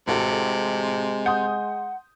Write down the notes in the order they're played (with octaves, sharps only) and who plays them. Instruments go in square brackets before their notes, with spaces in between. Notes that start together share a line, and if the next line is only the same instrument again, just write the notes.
[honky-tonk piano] A1 F#4 A4 [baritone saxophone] C3 [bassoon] G#3
[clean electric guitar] F#5 [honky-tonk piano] C6 D#6 G6